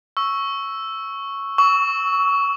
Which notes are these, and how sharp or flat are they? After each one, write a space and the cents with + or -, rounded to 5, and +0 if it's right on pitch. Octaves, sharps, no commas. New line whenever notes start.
C#6 +0 E6 +0
C#6 +20 E6 -20